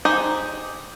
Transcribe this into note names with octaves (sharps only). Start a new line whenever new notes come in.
D#4 G4 G#4 C5